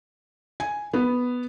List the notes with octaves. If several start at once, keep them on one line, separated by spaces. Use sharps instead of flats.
G#5
B3